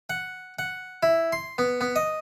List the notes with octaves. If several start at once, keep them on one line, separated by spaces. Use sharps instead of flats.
F#5
F#5
E4
C6
B3
B3
D#5